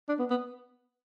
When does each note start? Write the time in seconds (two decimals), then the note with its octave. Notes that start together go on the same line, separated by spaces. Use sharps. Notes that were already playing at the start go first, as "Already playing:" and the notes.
0.09 D4
0.19 B3
0.30 B3